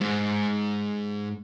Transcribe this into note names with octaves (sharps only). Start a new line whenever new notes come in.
G#2